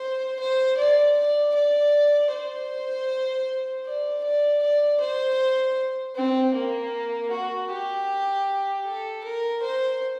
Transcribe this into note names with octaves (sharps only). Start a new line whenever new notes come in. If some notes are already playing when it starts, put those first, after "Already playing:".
Already playing: C5
C5
D5
D5
D5
C5
D5
D5
D5
C5
C4
A#3
F#4
G4
A4
A#4
C5